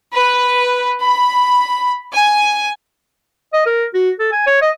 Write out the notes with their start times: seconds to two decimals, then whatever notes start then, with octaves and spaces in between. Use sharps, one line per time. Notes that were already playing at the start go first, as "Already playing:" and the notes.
0.14 B4
1.03 B5
2.14 G#5
3.53 D#5
3.66 A#4
3.94 F#4
4.19 A4
4.32 G#5
4.47 C#5
4.62 D#5